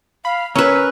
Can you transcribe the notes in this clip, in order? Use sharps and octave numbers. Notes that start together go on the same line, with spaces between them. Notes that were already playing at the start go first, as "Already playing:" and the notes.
F5 B5
C#4 A#4 B4 C#5 E6